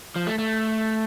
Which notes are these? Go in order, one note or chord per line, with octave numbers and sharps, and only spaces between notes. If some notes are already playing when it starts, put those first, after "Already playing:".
F3
A3
A3